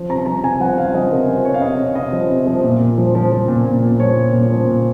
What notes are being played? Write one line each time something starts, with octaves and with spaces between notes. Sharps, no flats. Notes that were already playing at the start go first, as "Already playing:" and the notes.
Already playing: F3
C3 A#5
F3 A#5
C3 G#5
F3 F#5
F3 F5
F3 D#5
C3 A#4
F3 C5
C3 C#5
F5
C3 D#5
C3 C#5
C3 D#5
F3
C3
F3
A#2
A#2
F3
F3
F3
A#2
A#2
A#2
F3 C#5
A#2
A#2
F3
A#2